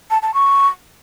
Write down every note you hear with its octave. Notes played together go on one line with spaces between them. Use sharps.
A5
A5
C#6